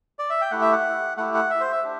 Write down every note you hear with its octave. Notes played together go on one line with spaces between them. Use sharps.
D5
E5
G5
A3 E4 G4 F#5
E5
F#5
A3 E4 G4 F#5
F#5
E5
C5
E5
D4 G4